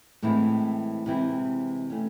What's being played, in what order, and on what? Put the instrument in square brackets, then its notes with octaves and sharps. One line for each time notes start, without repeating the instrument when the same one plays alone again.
[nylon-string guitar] A2 E3 G#3 C4 E4
C3 E3 G#3 C4 E4
A3 C#4